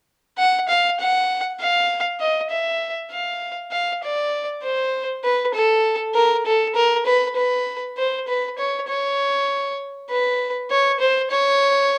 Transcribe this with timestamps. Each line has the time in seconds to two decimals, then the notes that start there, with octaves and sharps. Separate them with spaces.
0.38 F#5
0.68 F5
1.00 F#5
1.60 F5
2.20 D#5
2.50 E5
3.11 F5
3.72 F5
4.03 D5
4.63 C5
5.24 B4
5.54 A4
6.15 A#4
6.46 A4
6.75 A#4
7.06 B4
7.36 B4
7.98 C5
8.28 B4
8.58 C#5
8.88 C#5
10.10 B4
10.70 C#5
11.00 C5
11.31 C#5